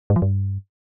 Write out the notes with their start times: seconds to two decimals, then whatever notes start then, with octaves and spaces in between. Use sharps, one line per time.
0.10 G#2
0.16 F3
0.22 G2